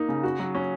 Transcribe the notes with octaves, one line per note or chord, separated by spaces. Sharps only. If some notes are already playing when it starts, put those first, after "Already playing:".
Already playing: A#3 D#4
C#3
F#4
F#3
C#4